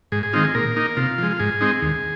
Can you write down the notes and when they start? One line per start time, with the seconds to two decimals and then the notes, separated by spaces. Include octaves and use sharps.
0.12 G#2 G#4
0.23 G#4
0.33 D#3 G#3 C4 D#4 F4
0.44 G#4
0.55 A#2 A#4
0.76 A#3 D#4
0.97 C3 F4
1.18 F3 G#3
1.31 F4
1.40 G#2 G#4
1.61 G#3 C4 D#4
1.82 D#2